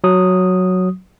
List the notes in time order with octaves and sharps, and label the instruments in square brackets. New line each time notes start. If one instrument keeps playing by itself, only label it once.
[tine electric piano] F#3 D#6